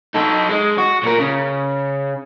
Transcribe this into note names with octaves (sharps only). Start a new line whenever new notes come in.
D#4 A4
G#3
F#4
A#2 A#4
C#3